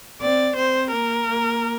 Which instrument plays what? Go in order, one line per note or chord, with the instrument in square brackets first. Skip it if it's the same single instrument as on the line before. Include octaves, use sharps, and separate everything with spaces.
[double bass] C4 [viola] D5
[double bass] C4 [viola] C5
[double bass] A#3 [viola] A#4
[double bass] A#3